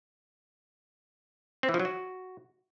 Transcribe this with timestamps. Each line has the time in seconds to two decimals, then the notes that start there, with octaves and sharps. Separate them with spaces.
1.63 C4
1.69 E3
1.74 F3
1.80 F#3
1.85 F#4